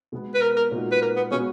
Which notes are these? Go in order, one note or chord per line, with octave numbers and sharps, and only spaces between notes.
B2 G#3 B3
B4
A#4
A#4
A#2 G#3 D#4 F#4
B4
A#4
B3
B2 G#3 B3 C#4 F#4